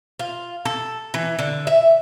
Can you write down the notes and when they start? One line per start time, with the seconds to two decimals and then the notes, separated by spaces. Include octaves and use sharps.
0.19 F4
0.65 A4
1.14 E3
1.39 D3
1.67 E5